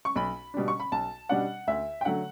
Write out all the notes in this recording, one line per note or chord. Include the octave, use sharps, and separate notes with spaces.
C#6
B1 B5
B2 G3 D4
C#6
B5
B1 A5
B2 G3 D4 F#5
D2 E5
G5
D3 F#3 A3 F#5